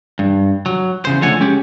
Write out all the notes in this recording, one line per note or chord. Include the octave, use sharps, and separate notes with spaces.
G2
F#3
E2 C#3 C5
D3 F3 A3 C#5 F#5 G#5
G#3 C#4 G4 G#4